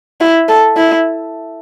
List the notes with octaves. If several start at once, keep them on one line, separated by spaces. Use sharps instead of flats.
E4
A4
E4